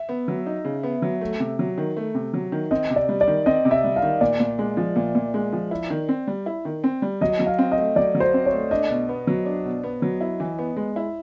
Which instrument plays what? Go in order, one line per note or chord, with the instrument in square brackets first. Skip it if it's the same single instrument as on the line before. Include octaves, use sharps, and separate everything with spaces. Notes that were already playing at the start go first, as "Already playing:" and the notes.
Already playing: [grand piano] E5
[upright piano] B3
F#3
D#4
C#3
B3
F#3
A3
C3
F#3
D#3
A3
C3
F#3
D#3
[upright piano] C4 [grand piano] D#5
[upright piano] C3
[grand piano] D5
[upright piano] G3
[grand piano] D5
[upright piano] D#3
[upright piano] C4 [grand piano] D#5
[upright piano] C3
[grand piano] E5
[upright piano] G3
[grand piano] F5
[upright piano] D#3
[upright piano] A#2 [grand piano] D5
[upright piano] A#2
G#3
F3
A#2
A#2
G#3
F3
E4
D#3
C4
G3
E4
D#3
C4
G3
[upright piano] F#3 [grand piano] D#5
[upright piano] F#3
[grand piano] F5
[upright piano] C4
[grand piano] D#5
[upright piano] A3
[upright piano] F#3 [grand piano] D5
[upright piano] F#3
[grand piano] C5
[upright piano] C4
[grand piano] C#5
[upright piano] A3
[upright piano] D4 [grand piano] D#5
[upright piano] B2
B3
F#3
D4
B2
B3
F#3
E4
E3
B3
G#3
E4